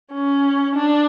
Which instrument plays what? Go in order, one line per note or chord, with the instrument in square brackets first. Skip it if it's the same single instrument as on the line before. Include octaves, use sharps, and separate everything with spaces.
[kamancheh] C#4
D4